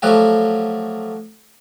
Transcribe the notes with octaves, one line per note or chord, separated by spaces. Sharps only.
F3 F#3 A3 F#4 G4